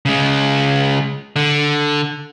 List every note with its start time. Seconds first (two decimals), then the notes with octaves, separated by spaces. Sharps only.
0.05 C#3 G#3
1.36 D3